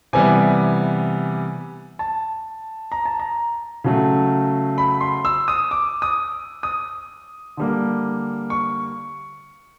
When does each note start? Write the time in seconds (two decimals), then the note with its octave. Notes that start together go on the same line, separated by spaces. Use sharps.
0.13 C3 E3 G3 B3 G#5
1.99 A5
2.92 A#5
3.05 A5
3.20 A#5
3.84 C#3 F#3 A3
4.78 B5
5.01 C6
5.25 E6
5.48 D#6
5.71 D6
6.02 D#6
6.63 D#6
7.57 D3 G3 A#3
8.50 C#6